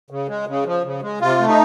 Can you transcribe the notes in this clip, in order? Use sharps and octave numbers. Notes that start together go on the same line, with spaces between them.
C#3
G#3
C#3
F3
C#3
G#3
C3 F4
A3
D#4